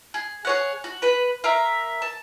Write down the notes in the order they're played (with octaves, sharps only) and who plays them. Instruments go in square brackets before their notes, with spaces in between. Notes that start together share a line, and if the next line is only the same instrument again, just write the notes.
[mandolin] G#4
G#4 C#5 F#5
F#4
B4 B5
A#4 E5 F5 A#5
A5